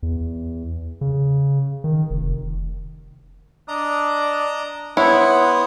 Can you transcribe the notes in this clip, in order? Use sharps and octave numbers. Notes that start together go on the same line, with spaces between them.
E2
C#3
D#3
F1
D4 D#5 A#5 D#6
B3 E4 C5 C#5 F#5 D#6